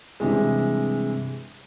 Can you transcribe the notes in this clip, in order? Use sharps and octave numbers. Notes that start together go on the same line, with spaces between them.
G2 C3 E3 G#3